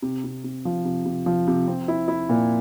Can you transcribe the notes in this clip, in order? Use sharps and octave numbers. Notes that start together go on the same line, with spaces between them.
C3
C3
C3
F3
C3
C3
F3
C3
C4
E4
E4
A#2